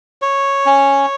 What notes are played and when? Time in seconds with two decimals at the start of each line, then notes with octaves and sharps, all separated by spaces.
0.22 C#5
0.66 C#4